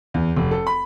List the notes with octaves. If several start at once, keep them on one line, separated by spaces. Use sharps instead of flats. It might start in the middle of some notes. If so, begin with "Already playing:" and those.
E2
F1
A4
B5